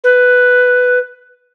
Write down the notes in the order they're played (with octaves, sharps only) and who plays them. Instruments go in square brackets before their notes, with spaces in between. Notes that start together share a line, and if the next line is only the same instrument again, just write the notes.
[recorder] B4